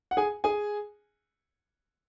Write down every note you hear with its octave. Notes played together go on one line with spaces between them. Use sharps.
F#5
G#4 G#5
G#4 G#5